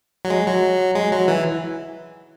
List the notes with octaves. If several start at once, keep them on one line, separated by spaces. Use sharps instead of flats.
F#3
G#3
F#3
G#3
F#3
E3